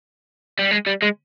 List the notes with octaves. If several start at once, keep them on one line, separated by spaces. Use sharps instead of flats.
G3
G#3
G3
G#3